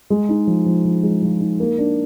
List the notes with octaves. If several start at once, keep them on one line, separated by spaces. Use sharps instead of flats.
G#3
D#4
F3
F3
F3
G#3
F3
D#4
A#3
D4